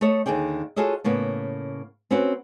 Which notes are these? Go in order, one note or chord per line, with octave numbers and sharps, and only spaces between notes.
A3 A4 C#5 D#5
D#2 D3 G#4 D5 G5
F4 F#4 G#4 A4 C#5 D#5
A2 C#3 A#3 B3
C4 C#4 F#4 G4 B4